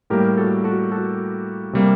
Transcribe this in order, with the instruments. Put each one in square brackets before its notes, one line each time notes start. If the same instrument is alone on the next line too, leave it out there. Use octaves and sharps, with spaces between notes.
[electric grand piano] A2 G3 A#3 G4 A#4
F#4 A4
F#4 A4
F#4 A4
C3 G3 A#3